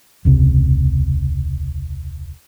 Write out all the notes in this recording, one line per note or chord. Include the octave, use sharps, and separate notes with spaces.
E1 C#2 C3